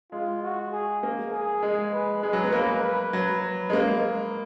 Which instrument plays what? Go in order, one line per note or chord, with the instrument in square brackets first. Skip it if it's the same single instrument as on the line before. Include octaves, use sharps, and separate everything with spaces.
[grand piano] G#3 [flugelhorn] F4
[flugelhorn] F#4
G#4
[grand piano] A#3
[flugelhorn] G#4
[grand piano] G#3
[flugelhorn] B4
[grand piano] G#3 [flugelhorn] G#4
[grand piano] F#3
B3
[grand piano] A#3 [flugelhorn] B4
[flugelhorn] B4
[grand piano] F#3
[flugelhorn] B4
[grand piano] G#3
A#3